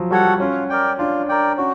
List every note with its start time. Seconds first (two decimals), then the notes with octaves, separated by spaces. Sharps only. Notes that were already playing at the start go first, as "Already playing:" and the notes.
Already playing: F3 F#3
0.11 G3 F#4 A4 C#5 F#5
0.40 C#4 F4
0.69 A#4 D5 G5
0.99 D4 F4
1.29 A#4 D5 G5
1.58 C#4 F#4